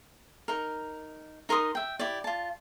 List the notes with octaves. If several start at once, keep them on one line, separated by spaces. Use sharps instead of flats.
D#4 A#4
D#4 A#4 C6 D#6
E5 G5
E4 G4 D5
F4 A5